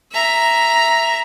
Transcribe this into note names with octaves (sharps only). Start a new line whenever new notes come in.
E5 A#5